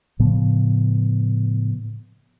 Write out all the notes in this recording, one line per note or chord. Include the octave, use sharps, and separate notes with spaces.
A2 C#3 F3 B3